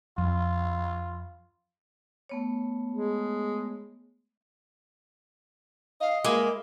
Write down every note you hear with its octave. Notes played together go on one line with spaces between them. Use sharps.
F2 F4
A3 B3 C#5
G#3
D#5 F5
G#3 A#3 E4 D6